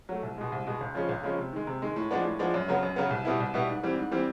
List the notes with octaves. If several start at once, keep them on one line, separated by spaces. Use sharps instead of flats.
F#3 A3
C2
B2 G#3
C2
B2 G#3
C#2
C#3 F3 G#3 C#4
C#2
C#3 F3 G#3 C#4
C3
D#3 G#3
C3
D#3 G#3
A2
F3 G#3 B3 D4
A2
F3 G#3 B3 D4
F#2
C#3 F#3 B3
F#2
C#3 F#3 B3
C2
B2 G3 B3 E4
C2
B2 G3 B3 E4
G#2
E3 G3 C4
G#2
E3 G3 C4